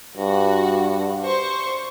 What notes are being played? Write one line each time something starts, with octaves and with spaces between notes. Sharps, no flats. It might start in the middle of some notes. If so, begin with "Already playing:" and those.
G2 F#4
C5 C#6